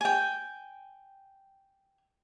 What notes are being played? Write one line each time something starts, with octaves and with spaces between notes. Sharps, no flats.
G5 G#5